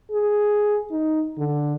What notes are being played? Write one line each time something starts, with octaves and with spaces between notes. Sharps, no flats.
G#4
D#4
D3